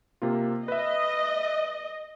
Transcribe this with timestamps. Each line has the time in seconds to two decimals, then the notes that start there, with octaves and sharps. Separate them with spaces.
0.22 C3 A#3 F4
0.68 B4 D#5 E5